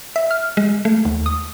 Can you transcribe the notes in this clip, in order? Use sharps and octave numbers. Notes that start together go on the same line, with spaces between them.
E5
F6
G#3
A3
D#2
D#6